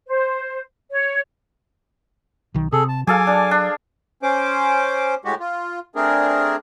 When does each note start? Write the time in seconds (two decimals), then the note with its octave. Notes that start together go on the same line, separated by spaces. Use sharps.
0.08 C5
0.91 C#5
2.54 B1 D#3
2.72 C3 G#4 A4
2.89 A5
3.07 F#3 G#4 A4 F5 G#5 D6
3.27 D4
3.51 D4
4.23 C#4 C5 D6
5.25 A2 G#3 F#4 G4
5.40 F4
5.96 A3 C4 D4 G#4 A#4